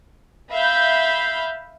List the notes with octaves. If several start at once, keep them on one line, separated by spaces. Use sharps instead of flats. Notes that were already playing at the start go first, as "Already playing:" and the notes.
E5 F5 B5 G6